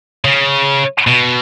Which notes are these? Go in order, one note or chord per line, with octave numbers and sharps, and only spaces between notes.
C#3
B2